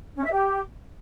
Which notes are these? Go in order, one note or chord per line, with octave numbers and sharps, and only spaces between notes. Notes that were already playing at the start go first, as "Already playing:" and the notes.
C#4
E5
G4